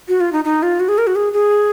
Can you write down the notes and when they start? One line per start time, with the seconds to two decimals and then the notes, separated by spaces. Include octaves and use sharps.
0.08 F#4
0.20 F4
0.32 D#4
0.44 D#4
0.63 F4
0.80 F#4
0.88 G#4
0.98 A#4
1.07 F#4
1.15 G#4
1.33 G#4